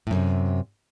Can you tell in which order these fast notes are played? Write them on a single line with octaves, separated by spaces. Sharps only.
A2 F#2 C3